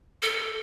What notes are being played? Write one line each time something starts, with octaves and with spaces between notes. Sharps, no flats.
A4